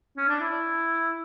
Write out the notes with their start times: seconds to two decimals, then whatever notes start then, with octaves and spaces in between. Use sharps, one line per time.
0.17 C#4
0.28 D4
0.40 E4